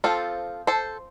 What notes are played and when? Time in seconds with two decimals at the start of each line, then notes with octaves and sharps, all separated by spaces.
0.04 F3 C4 F4 A4
0.67 A4 C5